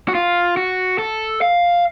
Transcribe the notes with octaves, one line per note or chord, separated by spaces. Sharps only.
F#4
F4
F#4
A4
F5